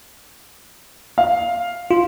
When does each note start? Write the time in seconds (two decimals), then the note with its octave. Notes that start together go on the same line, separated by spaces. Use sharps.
1.18 F5
1.91 F4